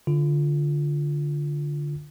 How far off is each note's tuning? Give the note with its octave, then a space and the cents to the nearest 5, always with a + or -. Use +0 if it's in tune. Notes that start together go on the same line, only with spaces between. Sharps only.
D3 +0 F4 -5